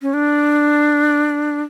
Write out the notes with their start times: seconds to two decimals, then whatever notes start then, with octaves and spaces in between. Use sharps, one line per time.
0.02 C#4
0.14 D4